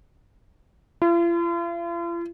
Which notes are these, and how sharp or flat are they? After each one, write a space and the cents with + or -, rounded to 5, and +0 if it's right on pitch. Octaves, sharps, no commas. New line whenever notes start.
F4 -45